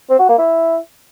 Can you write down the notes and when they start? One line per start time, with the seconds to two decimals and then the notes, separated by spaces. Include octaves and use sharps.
0.10 C4
0.19 F#4
0.29 A#3
0.38 E4